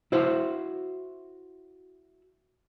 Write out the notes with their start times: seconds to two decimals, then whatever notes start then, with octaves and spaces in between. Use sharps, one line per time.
0.12 E4 F#4 C5